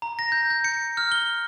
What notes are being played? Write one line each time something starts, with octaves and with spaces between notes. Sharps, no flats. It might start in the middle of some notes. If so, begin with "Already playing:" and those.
A#5
A#6
G6
G6
C#7
F6
G7